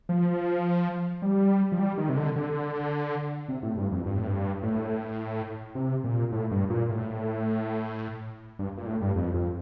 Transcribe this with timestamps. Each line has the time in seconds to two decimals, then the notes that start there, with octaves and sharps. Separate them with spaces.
0.09 F3
1.22 G3
1.72 F3
1.79 G3
1.98 D#3
2.09 C3
2.17 D3
2.36 D3
3.49 C3
3.63 A2
3.77 G2
3.91 F2
4.06 G2
4.16 A2
4.27 G2
4.63 A2
5.75 C3
6.04 A#2
6.32 A2
6.51 G2
6.70 A#2
6.89 A2
8.59 G2
8.77 A#2
8.87 A2
9.02 G2
9.16 F2
9.34 F2